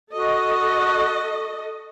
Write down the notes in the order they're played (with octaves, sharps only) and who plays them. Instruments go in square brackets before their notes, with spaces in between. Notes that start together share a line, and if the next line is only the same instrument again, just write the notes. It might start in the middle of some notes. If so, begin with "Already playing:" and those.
[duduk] F#4 [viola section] A4 D#5